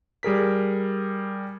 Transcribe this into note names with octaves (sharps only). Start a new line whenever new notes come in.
G3 G#4 A#4 B6